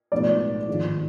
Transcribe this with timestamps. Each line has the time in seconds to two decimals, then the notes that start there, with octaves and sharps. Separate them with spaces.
0.12 B1 A2 F3 G#3 B3 D5
0.68 G#1 G#2 F3 G#3